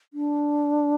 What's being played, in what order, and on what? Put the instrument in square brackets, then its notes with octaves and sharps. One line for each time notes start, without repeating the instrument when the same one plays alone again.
[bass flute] D4